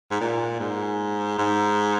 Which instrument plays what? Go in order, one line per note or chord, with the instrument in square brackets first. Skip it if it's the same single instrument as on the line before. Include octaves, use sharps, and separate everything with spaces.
[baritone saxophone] G#2
A#2
G#2
G#2